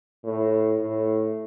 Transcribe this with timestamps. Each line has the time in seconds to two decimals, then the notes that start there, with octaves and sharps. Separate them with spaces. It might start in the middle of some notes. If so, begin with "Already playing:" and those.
0.24 A2
0.79 A2